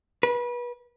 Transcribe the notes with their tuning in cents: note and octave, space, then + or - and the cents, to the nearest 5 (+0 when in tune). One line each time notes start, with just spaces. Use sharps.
B4 -30